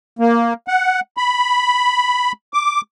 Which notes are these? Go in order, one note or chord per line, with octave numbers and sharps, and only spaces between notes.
A#3
F#5
B5
D6